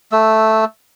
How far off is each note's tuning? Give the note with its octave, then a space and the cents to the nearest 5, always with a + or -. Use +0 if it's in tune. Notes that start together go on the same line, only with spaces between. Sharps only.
A3 +0 E6 -10